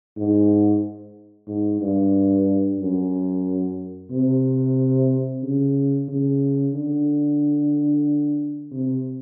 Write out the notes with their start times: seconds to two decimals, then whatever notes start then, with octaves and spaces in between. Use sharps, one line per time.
0.17 G#2
1.48 G#2
1.81 G2
2.79 F#2
4.11 C3
5.43 C#3
6.08 C#3
6.74 D3
8.72 C3